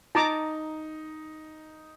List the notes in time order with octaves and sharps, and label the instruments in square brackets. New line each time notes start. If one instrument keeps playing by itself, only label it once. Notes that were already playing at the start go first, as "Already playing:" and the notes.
[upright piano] D#4 [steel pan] A5 A#5 D6